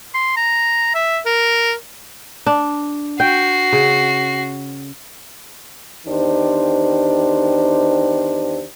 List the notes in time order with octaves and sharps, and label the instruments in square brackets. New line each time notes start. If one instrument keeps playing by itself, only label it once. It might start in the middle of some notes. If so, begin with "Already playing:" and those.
[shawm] C6
A#5
E5
A#4
[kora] D4
[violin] F#4 C7 [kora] G5
[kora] C#3
[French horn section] E2 D#3 D4 G4 C5